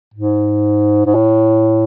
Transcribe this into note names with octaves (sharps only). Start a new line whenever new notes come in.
G#2
G#2
A2